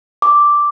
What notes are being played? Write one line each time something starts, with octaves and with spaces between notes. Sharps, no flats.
D6